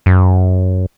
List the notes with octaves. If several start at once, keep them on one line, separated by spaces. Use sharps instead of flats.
F#2